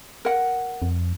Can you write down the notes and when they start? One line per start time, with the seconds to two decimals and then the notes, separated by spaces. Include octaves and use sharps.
0.25 A#4 F#5
0.82 F2